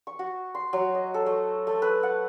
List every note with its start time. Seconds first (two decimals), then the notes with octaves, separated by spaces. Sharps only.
0.07 C#6
0.19 F#4
0.55 C6
0.73 F#3
0.95 D#5
1.14 A4
1.26 A3
1.67 A3
1.82 B4
2.03 F#5